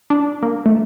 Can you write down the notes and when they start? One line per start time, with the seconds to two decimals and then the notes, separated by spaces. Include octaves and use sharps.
0.10 D4
0.43 A#3
0.66 A3